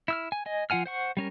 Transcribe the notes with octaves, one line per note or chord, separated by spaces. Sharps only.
E4 E6 F6
G#5
D#5 G#5
F3 F4 F#5 G#5 F6
C5 F#5 C#6
G3 C#4 A#4